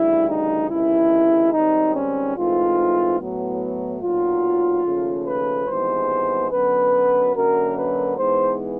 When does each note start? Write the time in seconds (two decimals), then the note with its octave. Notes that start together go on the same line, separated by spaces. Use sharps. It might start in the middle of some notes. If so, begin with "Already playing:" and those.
Already playing: D2 C#3 E3 G3 E4
0.29 D#4
0.70 C#2 C3 D#3 G#3 E4
1.53 G#2 D#3 G3 C4 D#4
1.95 C#4
2.36 G#2 E3 A3 C4 F4
3.20 A2 F#3 B3
4.02 B1 A#2 F#3 F4
4.85 D#2 C#3 F3 A3
5.26 B4
5.68 G#1 G2 E3 G#3 B3 C5
6.51 F#2 D3 F#3 B3 B4
7.35 F#2 D3 F#3 A#3 A#4
7.77 B4
8.17 G#2 E3 G#3 B3 C5